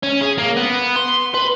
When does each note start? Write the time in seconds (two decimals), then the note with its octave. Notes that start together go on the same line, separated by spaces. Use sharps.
0.03 C#4
0.21 G#4
0.38 A#3
0.56 B3
0.96 C6
1.34 B4